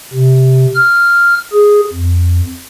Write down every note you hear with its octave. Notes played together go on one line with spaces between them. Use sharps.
C3
F6
G#4
F2